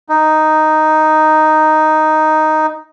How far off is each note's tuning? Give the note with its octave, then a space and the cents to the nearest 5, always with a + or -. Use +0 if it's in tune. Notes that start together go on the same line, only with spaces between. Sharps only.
D#4 +0